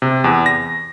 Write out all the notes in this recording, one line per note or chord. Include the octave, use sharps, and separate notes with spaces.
C3
E2
A#6